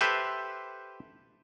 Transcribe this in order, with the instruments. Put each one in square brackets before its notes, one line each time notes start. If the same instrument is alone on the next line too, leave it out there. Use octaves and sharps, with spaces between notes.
[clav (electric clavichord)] G4 A4 B4 C5 E5